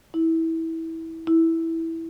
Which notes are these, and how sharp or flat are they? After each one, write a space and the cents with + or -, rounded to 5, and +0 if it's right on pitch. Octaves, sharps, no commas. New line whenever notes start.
E4 -20
E4 -10